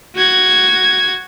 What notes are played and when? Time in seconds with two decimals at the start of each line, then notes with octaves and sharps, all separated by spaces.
0.15 F#4 G#6